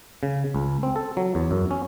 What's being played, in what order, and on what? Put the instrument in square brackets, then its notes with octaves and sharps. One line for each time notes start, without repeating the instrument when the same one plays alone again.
[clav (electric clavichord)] C#3
C#2
C4
A4
F#3
E2
F#2
C#4